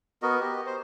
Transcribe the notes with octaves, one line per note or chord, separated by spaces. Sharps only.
B3 F#4 A#4 D#5
G4 D#5
C5